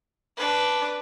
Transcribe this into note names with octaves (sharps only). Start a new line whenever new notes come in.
D4 B4